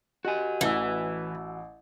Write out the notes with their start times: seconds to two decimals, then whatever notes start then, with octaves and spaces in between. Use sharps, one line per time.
0.25 F#4 G4 D#5 G#5
0.61 A1 E3 A5 E6